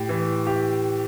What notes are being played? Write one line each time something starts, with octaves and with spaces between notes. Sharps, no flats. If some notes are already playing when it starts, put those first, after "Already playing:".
Already playing: A2 G4
E3
G4